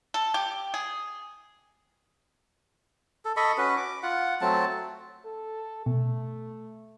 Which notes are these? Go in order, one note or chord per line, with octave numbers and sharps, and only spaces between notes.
A4
G4
G#4
A4
A4 D#5 B5 C#6
C#4 F#4 B4
D6
F4 F#5
F#3 A3 C4 A5
A4
B2 A3